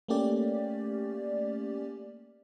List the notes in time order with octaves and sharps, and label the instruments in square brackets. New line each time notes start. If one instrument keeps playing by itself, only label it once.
[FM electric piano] A3 A#3 C#4 G4 D5